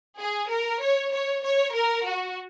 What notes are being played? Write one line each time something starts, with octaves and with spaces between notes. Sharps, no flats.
G#4
A#4
C#5
C#5
C#5
A#4
F#4